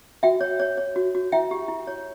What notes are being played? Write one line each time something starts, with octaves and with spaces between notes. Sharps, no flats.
F#4 E5 G5
C#5
C#5
C#5
F#4
F#4
E4 E5 G5
G4
E4
C#5